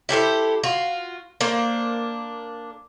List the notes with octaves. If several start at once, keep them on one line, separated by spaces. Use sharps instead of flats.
E4 G4 A4 C5
F4 F#4
A#3 D4 C5